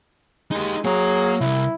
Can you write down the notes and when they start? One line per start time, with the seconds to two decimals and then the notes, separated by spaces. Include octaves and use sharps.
0.52 G#3 D#4 G4
0.85 F#3 A#3 G#4 A#5
1.41 C2 E4